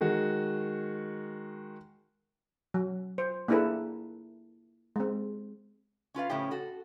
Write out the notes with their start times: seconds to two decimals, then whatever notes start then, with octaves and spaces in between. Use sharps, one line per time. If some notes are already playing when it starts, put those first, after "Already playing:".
0.01 D#3 G#3 F#4
2.74 F#3
3.18 C5
3.48 A#3 D4 E4 G#4 A4 B4
4.96 G#3 C4
6.14 C#4 F4 B4 F5
6.30 A2 C#3 F3 C#4 E4 G4
6.51 F#4 A4